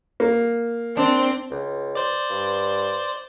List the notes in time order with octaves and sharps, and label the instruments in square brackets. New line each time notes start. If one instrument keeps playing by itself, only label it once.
[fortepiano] A#3
[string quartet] C4 [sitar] D4
[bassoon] C#2
[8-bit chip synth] C5 D5
[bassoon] G2